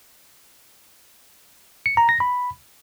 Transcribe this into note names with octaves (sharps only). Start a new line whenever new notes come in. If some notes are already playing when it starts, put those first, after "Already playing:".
C#7
A#5
A#6
B5